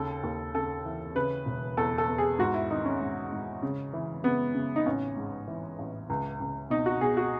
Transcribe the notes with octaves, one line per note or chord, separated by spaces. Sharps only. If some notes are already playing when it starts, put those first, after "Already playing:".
Already playing: D#2 C#3 A4
D#2
C#3 A4
E3
C#3 B4
E1
E2 A4
A4
E2
G#4
G#2 F#4
E4
D#3 D#4
C#4
G#2
G#2
C#3
E3
C#3 B3
C#3
D#4
A1 C#4
G#2
E3
A1
C#2
C#2
B2 D#4
F#4
B2 G#4
F#4